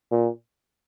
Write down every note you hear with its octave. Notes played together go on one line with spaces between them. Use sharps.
A#2